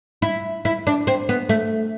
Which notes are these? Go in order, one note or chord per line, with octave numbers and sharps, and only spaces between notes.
E4
E4
D4
C4
B3
A3